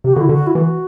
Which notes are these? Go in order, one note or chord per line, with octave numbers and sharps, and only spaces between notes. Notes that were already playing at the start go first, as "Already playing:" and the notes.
C3 G4
D3 F#4
E4
D3 F#4
E4
E3 F#4